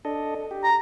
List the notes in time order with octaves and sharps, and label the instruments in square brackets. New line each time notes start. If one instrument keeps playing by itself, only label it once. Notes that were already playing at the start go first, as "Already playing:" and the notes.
[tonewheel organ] D4 A4 D#5
G4
[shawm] A#5